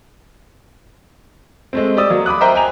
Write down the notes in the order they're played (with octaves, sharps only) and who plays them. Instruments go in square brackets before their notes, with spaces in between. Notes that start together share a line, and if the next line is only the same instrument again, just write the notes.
[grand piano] G#3 A3 C4
G4 D5 D#6 E6
F#3 A#3
B5 D6 D#6 F#6
A#4 C5 D#5 E5 G5 A#5
G5 G#5 A#5 F7